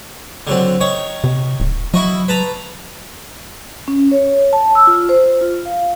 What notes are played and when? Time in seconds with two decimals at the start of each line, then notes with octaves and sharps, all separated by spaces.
0.47 D3 F#3 C4
0.81 D#3 C#5
1.24 C3
1.60 D1
1.94 F#3 E4 F#4 D#5
2.28 B4 A5 A#5
3.88 C#4
4.11 C#5
4.53 A5
4.75 E6
4.87 F4
5.09 C5
5.41 F4
5.66 F5